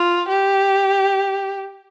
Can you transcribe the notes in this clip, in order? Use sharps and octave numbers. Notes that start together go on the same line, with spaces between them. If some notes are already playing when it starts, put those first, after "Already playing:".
Already playing: F4
G4